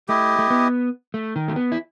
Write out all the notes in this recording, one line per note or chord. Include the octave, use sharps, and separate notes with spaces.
A3 E4 G4 D#5
A3
B3
A3
D#3
A3
B3
E4